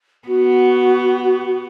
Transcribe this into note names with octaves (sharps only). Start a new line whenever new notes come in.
B3 F#4